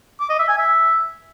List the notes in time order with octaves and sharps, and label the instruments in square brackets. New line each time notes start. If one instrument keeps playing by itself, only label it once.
[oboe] D6
D#5
E5
G#5
E5